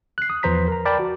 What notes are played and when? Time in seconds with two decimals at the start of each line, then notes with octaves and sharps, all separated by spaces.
0.18 F#6 C7
0.30 D#6
0.43 E2 F3 B4 C5 A#5 B6
0.68 A#4 A#5
0.85 A#4 D5 G5 A5 B5
0.99 F#4